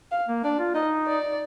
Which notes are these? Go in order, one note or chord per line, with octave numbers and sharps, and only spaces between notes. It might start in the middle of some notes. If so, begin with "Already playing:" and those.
F5
A#3
D4 D5
F4
D#4 D#5
D5